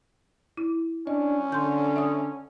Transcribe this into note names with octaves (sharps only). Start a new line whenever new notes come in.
E4
C#4 D4 D#5
D3 C6 G6
E5 D#6